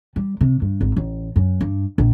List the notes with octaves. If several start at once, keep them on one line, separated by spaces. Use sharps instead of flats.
G3
C3
G2
G#1
A1
F#2
G2
A#1